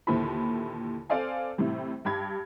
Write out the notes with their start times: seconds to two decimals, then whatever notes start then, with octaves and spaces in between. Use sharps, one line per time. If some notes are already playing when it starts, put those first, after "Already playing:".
0.07 D#2 A#2 D3 E3 C5 B5
1.09 C4 A4 C5 D5 F5 G#5
1.58 A2 C3 E3 G3
2.05 G2 G4 B5 G#6